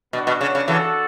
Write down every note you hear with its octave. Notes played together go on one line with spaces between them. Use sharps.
B2 B3 D4 F#4
B2
C#3
C#3
C#3 E3 D4 F#4 A4